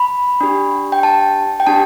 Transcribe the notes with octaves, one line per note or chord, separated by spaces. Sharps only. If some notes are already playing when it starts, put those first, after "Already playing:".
Already playing: B5
D4 G4
G5
A5
G5
D4 G4 A5